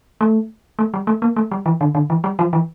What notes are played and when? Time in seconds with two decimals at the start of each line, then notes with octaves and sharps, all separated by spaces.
0.21 A3
0.79 A3
0.94 G3
1.07 A3
1.22 A#3
1.36 A3
1.51 G3
1.66 E3
1.81 D3
1.95 D3
2.10 E3
2.24 G3
2.39 F3
2.53 E3